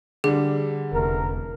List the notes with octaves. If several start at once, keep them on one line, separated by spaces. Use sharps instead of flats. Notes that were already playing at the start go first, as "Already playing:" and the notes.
D3 G3 G#4
E1 A1 C3 A3 A#4